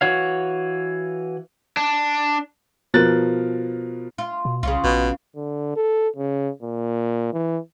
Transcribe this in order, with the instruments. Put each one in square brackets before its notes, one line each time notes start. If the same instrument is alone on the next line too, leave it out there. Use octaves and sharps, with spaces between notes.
[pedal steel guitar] E3 F#4 C#5 F5
[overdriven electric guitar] D4
[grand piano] B2 F3 A#4 F#6 A6
[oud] F4
[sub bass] B2
[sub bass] C2 [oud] C#3 C#4 F4
[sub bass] A#1 [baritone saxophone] B2
[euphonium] D3
A4
C#3
A#2
E3